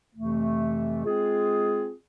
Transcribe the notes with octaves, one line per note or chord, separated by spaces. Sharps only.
F2 C3 E3 A3
G#3 C4 F4 G#4